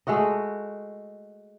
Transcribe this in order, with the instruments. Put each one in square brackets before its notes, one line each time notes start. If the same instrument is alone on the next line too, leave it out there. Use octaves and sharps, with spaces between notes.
[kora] G#3 A3 F#4 D#5